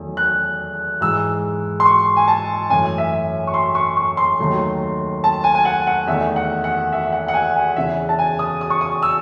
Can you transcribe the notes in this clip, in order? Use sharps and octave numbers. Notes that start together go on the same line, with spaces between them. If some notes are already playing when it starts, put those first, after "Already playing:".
Already playing: E2 D#3 F#3 A3
F#6
G#2 E3 G#3 E6
C6
C#6
G#5
A5
F#2 E3 A3 G#5
E5
C#6
C6
C#6
C#6
C6
D#2 D#3 F#3 A3
A5
G#5
G#5
F#5
F#5
E2 D#3 A3 E5
F#5
F#5
E5
F#5
F#5
G#5
G#5
E2 C#3 E3 E5
A5
G#5
D#6
D#6
C#6
D#6
E6